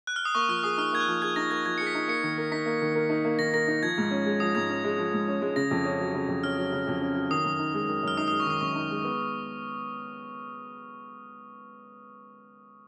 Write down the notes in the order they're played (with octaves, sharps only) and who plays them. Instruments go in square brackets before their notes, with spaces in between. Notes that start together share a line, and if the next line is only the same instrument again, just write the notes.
[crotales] F#6
F6
D#6
[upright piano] A#3 [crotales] C#6
[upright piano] F3 [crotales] F6
[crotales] F6
[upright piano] G#4 [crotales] D#6
[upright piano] D#4 [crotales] F6
[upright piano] A#3 [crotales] G#6
[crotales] F#6
[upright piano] F3
[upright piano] G#4 [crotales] G#6
[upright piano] D#4 [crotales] A#6
[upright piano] A#3 [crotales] G#6
[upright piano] F3 [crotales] G#6
[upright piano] G#4 [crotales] C#7
[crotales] B6
[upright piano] D#4
[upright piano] A#3 [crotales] C#7
[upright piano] D#3
A#4
[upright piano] D#4 [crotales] B6
[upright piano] A#3
D#3
A#4
D#4
A#3
[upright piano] D#3 [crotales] A#6
[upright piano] A#4 [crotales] A#6
[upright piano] D#4
[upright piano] F3 [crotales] G#6
[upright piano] G#2
C#4
G#3
[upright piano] F3 [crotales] D#6
[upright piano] G#2 [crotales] G#6
[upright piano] C#4
G#3
F3
G#2
C#4
G#3
[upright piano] C#3 [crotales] A#6
[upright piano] F2
C#4
F#3
C#3
F2
[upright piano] C#4 [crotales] F6
[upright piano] F#3
C#3
F2
C#4
F#3
[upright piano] D#3 [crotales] D#6
[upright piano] F#2
D#4
G#3
D#3
[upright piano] F#2 [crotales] F6
[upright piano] D#4 [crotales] D#6
[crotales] D#6
[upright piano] G#3
[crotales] C#6
[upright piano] D#3 [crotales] D#6
[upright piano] F#2 [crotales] C#6
[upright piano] D#4
G#3
B3